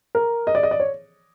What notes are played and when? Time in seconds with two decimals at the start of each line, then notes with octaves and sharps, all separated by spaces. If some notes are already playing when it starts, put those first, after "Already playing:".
0.15 A#4
0.47 D#5
0.55 D5
0.63 D#5
0.71 D5
0.80 C#5